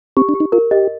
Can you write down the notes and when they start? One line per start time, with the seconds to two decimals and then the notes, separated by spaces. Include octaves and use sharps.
0.17 C4 G4
0.29 D4
0.35 G4
0.40 D#4
0.52 F4 A#4
0.71 G4 D#5